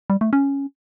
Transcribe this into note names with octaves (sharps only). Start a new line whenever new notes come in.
G3
A3
C#4